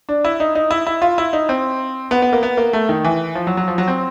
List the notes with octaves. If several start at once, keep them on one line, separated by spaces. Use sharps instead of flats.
D4
E4
D#4
D#4
E4
E4
F4
E4
D#4
C4
B3
B3
A#3
B3
A#3
A3
D#3
E3
F3
F#3
F#3
F3
F#3
C4